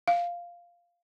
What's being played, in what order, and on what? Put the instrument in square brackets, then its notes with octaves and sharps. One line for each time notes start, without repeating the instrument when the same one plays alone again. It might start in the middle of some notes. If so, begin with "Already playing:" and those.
[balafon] F5